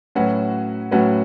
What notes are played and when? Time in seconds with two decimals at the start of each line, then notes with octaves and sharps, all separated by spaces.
0.15 A2 F#3 C#4 F#4 B4
0.91 A2 F#3 C#4 F#4 B4